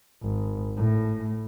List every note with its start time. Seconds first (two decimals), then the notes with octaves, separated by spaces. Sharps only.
0.22 G#1
0.77 A2